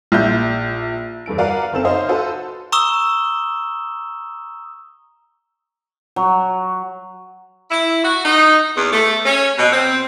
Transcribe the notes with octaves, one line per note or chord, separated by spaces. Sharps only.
A#1 E5 G6
E2 G2 A4 D7
F#4 A#4 B4 D5 F5 F#5
F#1 C4 A4 E7
D#4 C5 C#5 D#5 F5
F#4 A4 B4 C5
A#5 C#6 D#6 E6 E7 G7
F#3
E4
F#4
D#4
E2
A3
C#4
B2
C4